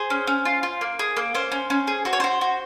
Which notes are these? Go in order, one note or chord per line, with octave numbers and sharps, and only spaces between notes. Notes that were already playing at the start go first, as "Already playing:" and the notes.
Already playing: G#4 C5
C#4
C#4
F4
F4
A#3
G#4
A#3
C#4 C5
C#4
C#4
G#4
F#4 C5
C#5
F#4 C5
F#4